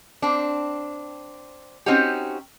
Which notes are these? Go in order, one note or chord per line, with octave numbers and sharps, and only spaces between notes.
C4 D4
C4 C#4 D#4 F#4 G4